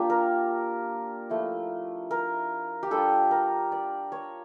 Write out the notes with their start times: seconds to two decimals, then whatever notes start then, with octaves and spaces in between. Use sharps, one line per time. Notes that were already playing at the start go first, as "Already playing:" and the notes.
Already playing: A#3 D4 F4 G4
0.10 A#4
1.30 F3 A3 E4
2.11 A#4
2.83 G4
2.91 G3 D4 F4 A4
3.31 A#4
3.72 D5
4.12 C#5